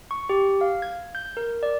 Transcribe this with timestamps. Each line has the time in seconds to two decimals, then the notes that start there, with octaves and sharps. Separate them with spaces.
0.11 C#6
0.29 G4
0.61 F5
0.82 G#6
1.15 G6
1.37 A#4
1.63 D5